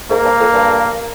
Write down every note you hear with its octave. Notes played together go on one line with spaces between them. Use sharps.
G#2 A#3
G2
F2
G2